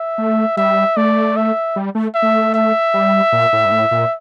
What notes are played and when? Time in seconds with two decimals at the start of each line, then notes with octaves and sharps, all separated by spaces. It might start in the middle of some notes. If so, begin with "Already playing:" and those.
Already playing: E5
0.18 A3
0.57 G3 E5
0.97 A3 D5
1.36 E5
1.76 G3
1.95 A3
2.15 E5
2.22 A3
2.54 E5
2.94 G3
3.32 A#2
3.53 A2
3.65 G2
3.72 A2
3.91 A#2